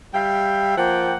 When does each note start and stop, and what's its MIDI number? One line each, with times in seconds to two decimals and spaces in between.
0.14 0.77 55
0.14 0.77 76
0.14 0.77 77
0.14 0.77 79
0.78 1.16 53
0.78 1.16 58
0.78 1.16 78
0.78 1.16 79